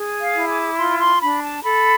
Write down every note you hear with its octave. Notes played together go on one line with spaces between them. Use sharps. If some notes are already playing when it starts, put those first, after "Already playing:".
Already playing: G#4
F5
E4
D6
F4 C6
C6
D4 B5
A5
A4 B5